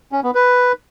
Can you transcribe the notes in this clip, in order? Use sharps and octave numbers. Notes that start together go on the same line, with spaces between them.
C#4
B3
B4